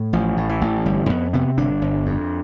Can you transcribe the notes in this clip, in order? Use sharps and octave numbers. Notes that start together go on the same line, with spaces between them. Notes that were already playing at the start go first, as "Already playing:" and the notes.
Already playing: A2
A1 F3
A2
E3
A1
G1 G3
F2 B3
C3 B3
G1 D4
G1
F2